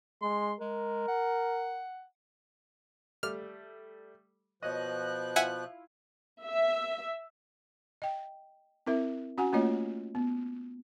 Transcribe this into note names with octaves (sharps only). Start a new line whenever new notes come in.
G#3 C6
G#3 A#4
F#5
G3 A3 D6 F6
B2 F3 C#5 D#5 F#6
E4 F4 E5 F#5 G#5
E5
D#5 G5
C4 E4 A#4 E5
C#4 F#4 F#5 G#5
A3 A#3 C#4 F4 C#5 D#5
B3